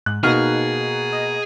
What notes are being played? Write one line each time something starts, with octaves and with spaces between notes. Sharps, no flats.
G#2 F#6
B2 A#3 D#4 G#4 F6
D#5